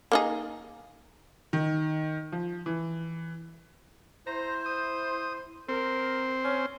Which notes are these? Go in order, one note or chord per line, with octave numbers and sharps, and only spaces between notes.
A#3 D#4 G#4
D#3
F3
E3
E4 C5 A#5
D#6
C4 A#4 C5
C#4